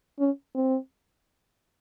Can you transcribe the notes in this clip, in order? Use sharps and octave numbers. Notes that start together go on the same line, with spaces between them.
C#4
C4